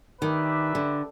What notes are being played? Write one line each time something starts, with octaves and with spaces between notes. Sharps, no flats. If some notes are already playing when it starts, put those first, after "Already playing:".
D#3 D4 G4 B4 E5
D3